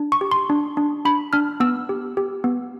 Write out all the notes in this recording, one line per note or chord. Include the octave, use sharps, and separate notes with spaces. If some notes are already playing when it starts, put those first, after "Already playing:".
Already playing: D4
C#6
G4
C6
D4
D4
D4 B5
D4 F6
B3 E6
G4
G4
B3